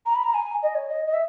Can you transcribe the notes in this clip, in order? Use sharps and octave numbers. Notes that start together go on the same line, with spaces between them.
A#5
B5
A#5
G#5
D#5
C#5
D#5
D#5
E5